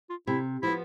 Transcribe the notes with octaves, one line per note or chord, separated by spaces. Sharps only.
F4
C3 E4
F3 B3 E4